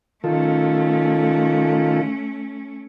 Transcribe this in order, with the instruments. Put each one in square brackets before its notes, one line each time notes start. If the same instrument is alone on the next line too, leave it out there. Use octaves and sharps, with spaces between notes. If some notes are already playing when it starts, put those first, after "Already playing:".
[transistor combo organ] D#3 F4 A4 [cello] A3 C#4